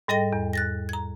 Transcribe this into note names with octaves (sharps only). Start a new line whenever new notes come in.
G#2 G3 A4 D#5 G5 A#6
E2
F#6 A6 A#6
A#5 G#6